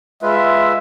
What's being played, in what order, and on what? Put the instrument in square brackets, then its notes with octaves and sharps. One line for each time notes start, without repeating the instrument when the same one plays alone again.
[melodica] G#3 F4 B4 [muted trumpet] E5